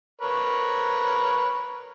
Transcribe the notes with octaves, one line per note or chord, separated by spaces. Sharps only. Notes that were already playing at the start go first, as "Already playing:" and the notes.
A#4 B4 C#5